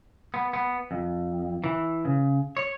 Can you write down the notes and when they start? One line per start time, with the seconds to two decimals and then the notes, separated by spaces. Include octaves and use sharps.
0.34 B3
0.53 B3
0.91 F2
1.64 E3
2.05 C#3
2.57 C#5